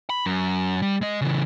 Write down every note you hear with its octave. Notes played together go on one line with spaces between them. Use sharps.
B5
F#2
G3
G#3 D#5
C#3 E3